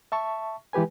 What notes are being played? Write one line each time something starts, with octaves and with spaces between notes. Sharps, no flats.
E5 A5 C#6
E3 G#3 G4 B4 G#5